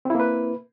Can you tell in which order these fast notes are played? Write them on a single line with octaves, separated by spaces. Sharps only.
C4 E4 A#3 B4